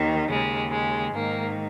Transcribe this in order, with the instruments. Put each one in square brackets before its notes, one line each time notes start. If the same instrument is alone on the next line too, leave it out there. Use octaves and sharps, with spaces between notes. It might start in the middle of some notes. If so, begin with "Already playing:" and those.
Already playing: [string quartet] D#2 D#3
D#2 C#3 G#3
G#3
G#2 D#3 A#3